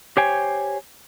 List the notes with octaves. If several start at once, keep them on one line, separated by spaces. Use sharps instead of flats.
G4 C5 C#5 G5 G#5